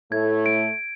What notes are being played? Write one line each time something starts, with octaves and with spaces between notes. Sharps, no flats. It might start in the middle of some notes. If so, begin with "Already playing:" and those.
A2 A3 G#6
D7